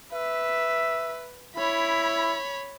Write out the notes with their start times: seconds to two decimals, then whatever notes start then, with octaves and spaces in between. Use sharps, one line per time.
0.12 B4 E5
1.55 E4 C#5 B5